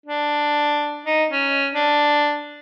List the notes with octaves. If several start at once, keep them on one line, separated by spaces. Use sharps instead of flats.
D4
D#4
C#4
D4